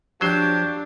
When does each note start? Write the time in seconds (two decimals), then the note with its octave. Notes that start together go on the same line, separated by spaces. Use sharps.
0.21 F3 F#3 D4 G4 C5 C#5